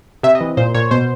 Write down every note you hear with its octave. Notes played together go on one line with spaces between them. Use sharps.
C3 E5
D#5
E3
A#2 C5
A#2 C#5
B2 C5